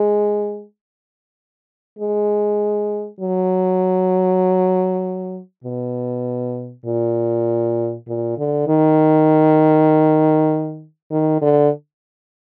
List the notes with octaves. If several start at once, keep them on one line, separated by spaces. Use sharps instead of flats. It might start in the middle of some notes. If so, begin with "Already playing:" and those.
Already playing: G#3
G#3
F#3
B2
A#2
A#2
D3
D#3
D#3
D3